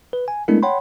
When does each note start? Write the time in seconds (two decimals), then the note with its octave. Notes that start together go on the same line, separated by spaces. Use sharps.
0.13 B4
0.28 G#5
0.48 G#3 A3 B3 D4 E4 A#4
0.63 C#5 F#5 G5 B5 C6